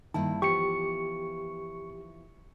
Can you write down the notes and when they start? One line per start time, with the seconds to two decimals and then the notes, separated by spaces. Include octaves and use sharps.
0.14 G2 D#3 A#3 E4 A5
0.42 E3 F3 B3 G4 C#6 C#7